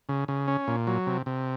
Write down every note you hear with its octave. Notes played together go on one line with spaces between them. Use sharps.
C#3
C#3
C#4
A#2
F#3
C3
C3